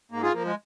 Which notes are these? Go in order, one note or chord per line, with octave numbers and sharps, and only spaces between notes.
G#2 A#3
F4 G#4
F3 A#3
G#3